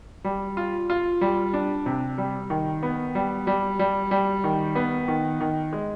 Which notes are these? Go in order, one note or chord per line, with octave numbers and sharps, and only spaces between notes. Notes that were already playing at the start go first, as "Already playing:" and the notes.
G3
F4
F4
G3
D4
C3
G3
D#3
B3
G3
G3
G3
G3
D#3
B3
D#3
D#3
G#3